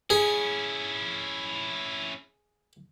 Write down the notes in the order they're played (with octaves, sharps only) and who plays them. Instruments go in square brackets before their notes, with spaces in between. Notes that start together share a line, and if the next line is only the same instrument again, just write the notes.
[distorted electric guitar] C#4 E4 [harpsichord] G#4